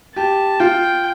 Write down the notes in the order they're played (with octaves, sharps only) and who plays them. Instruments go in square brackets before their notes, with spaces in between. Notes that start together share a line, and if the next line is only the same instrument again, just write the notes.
[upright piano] G4 [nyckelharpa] A5
[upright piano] F4 [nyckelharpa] G5